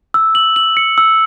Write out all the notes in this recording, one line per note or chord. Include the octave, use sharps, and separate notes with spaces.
E6
F#7
F#7
C#7
E6